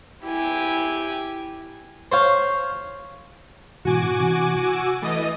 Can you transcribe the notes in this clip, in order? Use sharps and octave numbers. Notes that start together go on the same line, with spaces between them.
E4 G4 G#5
C5 C#5 F5
G#2 B2 E3 F#4 G#5 D6
C3 E3
F#5 E6
E3 A3 D#5 A5 D#6